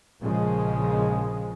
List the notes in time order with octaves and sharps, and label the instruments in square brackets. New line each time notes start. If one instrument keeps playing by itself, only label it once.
[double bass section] A#1 C#3 F3 G#3